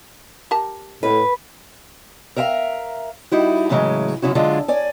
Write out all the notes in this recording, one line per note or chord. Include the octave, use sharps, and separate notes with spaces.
G4 A#4 A5
A2 B4
A#4 E5 F5 G5 A#5
G3 D#4 E4 F#4
A2 C#3 E3 F#3 G#3
F#2 C#3 C#4 E4 F#4
D3 F#3 G#3 D4 F4
C#5 D5 G#5